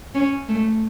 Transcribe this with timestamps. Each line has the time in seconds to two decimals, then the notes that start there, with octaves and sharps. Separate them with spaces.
0.14 C#4
0.48 A3